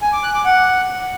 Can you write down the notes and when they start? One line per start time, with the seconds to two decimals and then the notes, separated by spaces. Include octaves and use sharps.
0.02 G#5
0.12 D6
0.23 F#6
0.34 D6
0.45 F#5